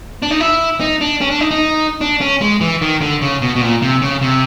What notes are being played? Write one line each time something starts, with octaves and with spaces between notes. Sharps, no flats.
D4
D#4
E4
D#4
D4
C#4
D4
D#4
D#4
D4
C#4
G#3
E3
D#3
D3
C#3
B2
B2
A#2
C3
C#3
C3